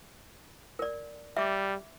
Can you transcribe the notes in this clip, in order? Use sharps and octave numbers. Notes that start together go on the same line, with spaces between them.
A#4 D5
G3 E5 D6